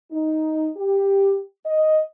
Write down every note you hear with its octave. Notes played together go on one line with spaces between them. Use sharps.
D#4
G4
D#5